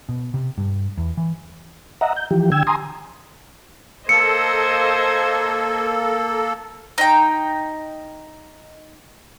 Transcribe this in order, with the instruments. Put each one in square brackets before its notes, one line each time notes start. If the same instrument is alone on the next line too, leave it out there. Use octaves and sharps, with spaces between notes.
[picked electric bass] B2
C3
G2
E2
E3
[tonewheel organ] D#5 E5 F#5 A#5
G6
E3 F3 G4
D3 G5 E6 G#6
G#5 A#5 C6 D#6
[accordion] A#3 A4 [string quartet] C5 D#5 G#6 [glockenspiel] C#7
[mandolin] D#4 G5